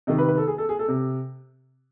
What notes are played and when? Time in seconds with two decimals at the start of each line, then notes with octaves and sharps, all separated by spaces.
0.07 C3 D#3 D#5
0.18 B4
0.28 B4
0.38 A4
0.48 G#4
0.58 A4
0.69 G#4
0.79 A4
0.88 C3